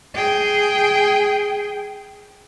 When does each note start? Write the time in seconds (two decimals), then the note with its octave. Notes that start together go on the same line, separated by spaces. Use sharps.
0.15 G#4 G5